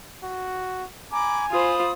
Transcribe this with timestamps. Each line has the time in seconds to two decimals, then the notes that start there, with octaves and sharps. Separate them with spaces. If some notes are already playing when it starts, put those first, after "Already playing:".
0.23 F#4
1.13 G#5 A#5 B5 D6
1.51 F4 C5 B5 D#6